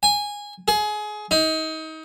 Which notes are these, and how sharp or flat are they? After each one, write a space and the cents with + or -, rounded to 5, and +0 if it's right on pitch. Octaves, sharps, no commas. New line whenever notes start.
G#5 -15
G#4 +25
D#4 +30